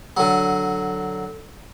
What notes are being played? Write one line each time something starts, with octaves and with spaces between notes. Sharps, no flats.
D3 F#3